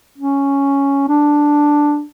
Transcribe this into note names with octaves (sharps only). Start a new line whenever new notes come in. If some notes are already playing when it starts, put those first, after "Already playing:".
C#4
D4